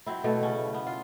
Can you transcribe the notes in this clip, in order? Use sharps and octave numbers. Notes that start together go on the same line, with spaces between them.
F#3 C4 E4
B2 A3
C#3 C#4
B3
F4